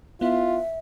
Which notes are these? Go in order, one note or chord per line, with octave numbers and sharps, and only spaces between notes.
B3 E4 F4 E5